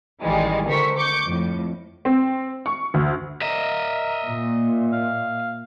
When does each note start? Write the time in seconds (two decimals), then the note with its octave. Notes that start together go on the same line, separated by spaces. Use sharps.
0.22 A1 D#3 E3 G3 G#3
0.68 D3 A#4 C5 C#6 B6
0.97 C#6 D6 G6 C#7
1.26 F2 A2
2.05 C4
2.66 C#6
2.94 D2
3.42 A#4 D#5 E5
4.24 A#2
4.92 F5